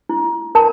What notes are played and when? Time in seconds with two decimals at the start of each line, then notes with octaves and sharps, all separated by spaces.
0.09 E4
0.55 A#4 A5